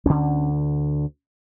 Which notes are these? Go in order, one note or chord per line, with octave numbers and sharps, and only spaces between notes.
D2 D3 C#4